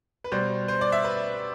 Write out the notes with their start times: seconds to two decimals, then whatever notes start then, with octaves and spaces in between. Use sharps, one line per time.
0.24 B4
0.32 B2 G3 C5
0.68 C5
0.81 D5
0.92 E5
1.04 B4